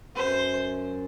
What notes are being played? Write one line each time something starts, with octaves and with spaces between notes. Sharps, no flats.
F#2 C5